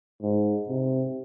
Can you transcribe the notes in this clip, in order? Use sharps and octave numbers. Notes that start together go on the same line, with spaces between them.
G#2
C3